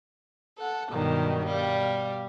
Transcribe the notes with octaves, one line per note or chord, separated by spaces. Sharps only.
A4 F#5
G2 B2 D#3 F#3 G3
B2 G3 F5